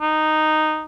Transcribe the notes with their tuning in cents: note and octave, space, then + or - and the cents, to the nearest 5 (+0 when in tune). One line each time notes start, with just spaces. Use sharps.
D#4 -10